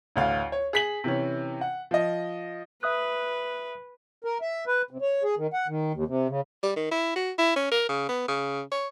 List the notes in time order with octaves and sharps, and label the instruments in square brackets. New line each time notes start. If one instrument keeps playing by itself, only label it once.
[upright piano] A1 D2 F5
C#5
G#4 B6 F#7
C3 E3 C#4
F#5
F3 D#5
[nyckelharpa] B4 [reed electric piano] E5 D#6 F#6
[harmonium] A#4
E5
B4
C3
C#5
G#4
D#3
F#5
D#3
D#2
C3
C#3
[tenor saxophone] G3
D#3
E4
F#4
E4
C#4
A#4
C#3
B3
C#3
C#5